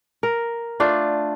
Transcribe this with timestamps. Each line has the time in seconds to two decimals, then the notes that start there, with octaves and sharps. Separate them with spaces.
0.23 A#4
0.80 A3 D4 F4